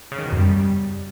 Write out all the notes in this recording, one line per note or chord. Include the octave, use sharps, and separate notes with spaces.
C#3
D#3
B2
F#2
G3